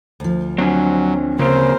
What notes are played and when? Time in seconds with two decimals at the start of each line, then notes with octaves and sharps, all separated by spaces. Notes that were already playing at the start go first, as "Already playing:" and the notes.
0.20 D2 F3
0.58 F#3 C4 D4 G#5
1.39 A#2 C#3 C4 A#4 C5